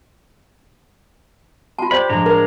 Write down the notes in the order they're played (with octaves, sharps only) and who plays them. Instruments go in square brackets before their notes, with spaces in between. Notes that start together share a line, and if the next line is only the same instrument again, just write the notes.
[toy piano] F4 A5 [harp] C6
[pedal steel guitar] G4 B5 [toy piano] C5 D5
[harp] A2 F3 [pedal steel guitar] G#3 D4 A#5
[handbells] A#4 [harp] C#5